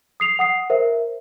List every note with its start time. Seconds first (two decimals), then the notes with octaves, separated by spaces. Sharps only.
0.20 D#6 C7 F7
0.39 F#5 D#6 C7
0.70 A#4 C5 E5